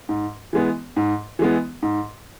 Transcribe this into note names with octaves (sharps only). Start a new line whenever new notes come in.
G#2
E3 G#3 B3
G#2
E3 G#3 B3
G#2